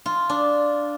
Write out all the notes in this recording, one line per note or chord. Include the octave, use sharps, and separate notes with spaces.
F4
D4